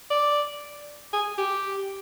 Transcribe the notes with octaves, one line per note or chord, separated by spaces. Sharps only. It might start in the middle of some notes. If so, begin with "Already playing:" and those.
D5
G#4
G4